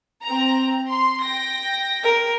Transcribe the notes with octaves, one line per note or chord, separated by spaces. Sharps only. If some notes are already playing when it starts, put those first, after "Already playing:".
C4 A#5
C6
G5 A#6
A#4